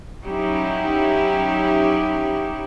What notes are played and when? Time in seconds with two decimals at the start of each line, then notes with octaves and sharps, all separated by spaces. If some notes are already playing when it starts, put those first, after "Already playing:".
0.24 F#3 C#4 D#4 E4 G4